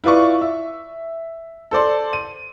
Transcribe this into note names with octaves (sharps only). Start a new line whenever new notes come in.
E4 F4 B4 D5 C#6
E5
A4 C5 D5 C6
D#7